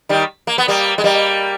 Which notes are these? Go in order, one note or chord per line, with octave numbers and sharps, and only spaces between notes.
D#3 G3
A#3
B3
G3 A#3
G#3
G3 A#3